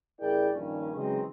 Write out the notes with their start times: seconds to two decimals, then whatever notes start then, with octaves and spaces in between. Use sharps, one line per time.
0.20 A1 E4 G#4 A#4 D5 G5
0.53 A#1 G2 A#2 D#3 C#4
0.95 C#3 E3 F#3 G#3 C4 D#5